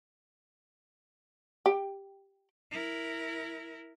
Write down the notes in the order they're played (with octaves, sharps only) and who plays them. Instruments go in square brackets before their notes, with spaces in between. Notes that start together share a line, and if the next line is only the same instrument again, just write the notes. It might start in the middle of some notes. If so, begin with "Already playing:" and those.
[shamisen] G4
[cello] E4 A#4